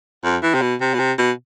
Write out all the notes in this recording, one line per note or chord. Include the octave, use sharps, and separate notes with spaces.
F2
E3
C3
B2
C3
B2
C3
B2